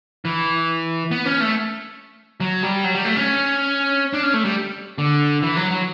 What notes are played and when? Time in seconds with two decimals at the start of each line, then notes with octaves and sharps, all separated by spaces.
0.25 E3
1.11 B3
1.25 C#4
1.41 A3
2.40 F#3
2.63 G3
2.84 F#3
2.94 G3
3.05 A3
3.16 C#4
4.13 D4
4.23 C#4
4.34 A3
4.45 G3
4.98 D3
5.43 E3
5.56 F#3
5.71 F#3